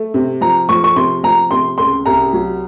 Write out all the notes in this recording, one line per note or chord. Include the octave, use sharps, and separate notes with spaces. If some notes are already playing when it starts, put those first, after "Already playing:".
Already playing: A3
C3
F3 A#5
F3 C#6
C#6
C3 C6
F3 A#5
C3 C6
C#2 C6
C2 A#5
F#3